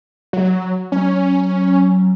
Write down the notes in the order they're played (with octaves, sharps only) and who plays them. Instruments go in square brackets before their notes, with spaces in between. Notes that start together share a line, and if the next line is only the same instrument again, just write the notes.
[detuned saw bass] F#3
[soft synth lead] F#3 [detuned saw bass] C#4